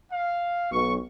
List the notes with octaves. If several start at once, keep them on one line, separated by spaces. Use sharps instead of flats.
F5
B1 C#6